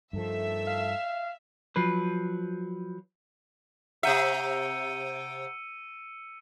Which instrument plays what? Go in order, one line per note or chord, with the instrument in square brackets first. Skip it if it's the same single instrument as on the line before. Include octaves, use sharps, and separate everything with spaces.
[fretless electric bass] G2 F3 [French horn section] D#3 A3 A4 [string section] E5
[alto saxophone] F5
[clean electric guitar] F3 F#3 B4
[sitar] C3 E5 [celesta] F#5 A#5 G6 [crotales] E6 C#7 D#7